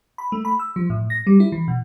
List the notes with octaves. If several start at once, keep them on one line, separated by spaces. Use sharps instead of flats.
B5
A3
B5
E6
F3
A2
A#6
G3
E4
E3
B2